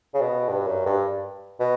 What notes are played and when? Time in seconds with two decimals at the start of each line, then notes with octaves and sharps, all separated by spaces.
0.14 C#3
0.21 B2
0.49 G2
0.67 F#2
0.86 G2
1.60 B2